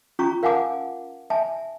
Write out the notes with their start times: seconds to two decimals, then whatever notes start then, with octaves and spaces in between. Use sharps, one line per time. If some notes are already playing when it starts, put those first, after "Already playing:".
0.19 C#4 F4 A#5 C#6
0.43 A#4 F5 F#5 G#5 A5 D6
1.30 E5 G#5 A5